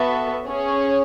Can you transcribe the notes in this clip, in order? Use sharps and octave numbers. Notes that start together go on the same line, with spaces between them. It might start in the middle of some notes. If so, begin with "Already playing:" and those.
Already playing: B3 F#4 A4 E5
C#4 G#4 C#5